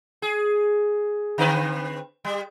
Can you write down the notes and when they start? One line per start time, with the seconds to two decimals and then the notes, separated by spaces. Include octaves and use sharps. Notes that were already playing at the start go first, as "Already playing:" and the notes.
0.22 G#4
1.38 D3 C4 B4
2.25 G3